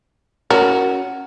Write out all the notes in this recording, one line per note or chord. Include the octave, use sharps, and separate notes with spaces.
C#4 F#4 A#4